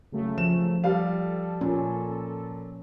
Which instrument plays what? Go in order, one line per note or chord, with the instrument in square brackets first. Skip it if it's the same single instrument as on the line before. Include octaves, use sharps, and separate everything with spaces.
[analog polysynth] C#3 F#3 A3
[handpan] F3 [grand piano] E7
[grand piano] G3 F5 [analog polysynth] A4
[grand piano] A#2 [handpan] C#4